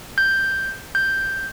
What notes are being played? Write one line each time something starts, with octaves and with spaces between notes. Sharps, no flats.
G6
G6